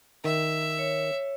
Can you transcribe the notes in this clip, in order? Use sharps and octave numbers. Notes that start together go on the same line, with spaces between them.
D#3 E5
C#5